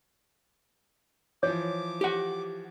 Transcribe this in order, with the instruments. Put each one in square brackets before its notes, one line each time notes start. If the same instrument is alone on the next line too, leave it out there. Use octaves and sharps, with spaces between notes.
[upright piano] E3 F3 [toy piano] C#5 [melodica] D6
[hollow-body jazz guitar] G4 F#5